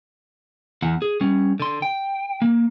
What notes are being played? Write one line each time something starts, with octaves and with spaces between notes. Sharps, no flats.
E2 F#5
G#4
G3 C#4
D3 C6
G5
A#3